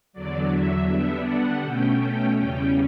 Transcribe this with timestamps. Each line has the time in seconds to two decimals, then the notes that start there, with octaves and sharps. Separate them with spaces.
0.13 E2 D3 F#3 D5
0.50 E5
0.87 D3 G3 B3 D4 E5
1.25 F#5
1.62 B2 A3 C#4 G5
2.00 G5
2.36 E2 C#3 G3 C#4 G5